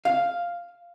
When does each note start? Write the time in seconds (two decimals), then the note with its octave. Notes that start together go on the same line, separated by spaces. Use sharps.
0.05 F5